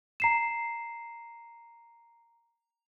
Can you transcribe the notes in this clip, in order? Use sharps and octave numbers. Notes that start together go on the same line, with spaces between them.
A#5 C7 E7